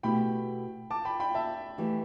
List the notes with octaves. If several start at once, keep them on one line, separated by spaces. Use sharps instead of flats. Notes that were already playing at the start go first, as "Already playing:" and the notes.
B2 A3 E4 G4 G5 B5
A5 D6
G5 B5
G5 B5
E5 A5
E3 A3 G4